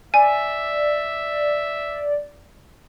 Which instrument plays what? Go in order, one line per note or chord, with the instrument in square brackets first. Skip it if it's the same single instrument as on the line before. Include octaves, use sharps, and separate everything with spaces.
[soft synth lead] D5 [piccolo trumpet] E5 [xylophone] G#5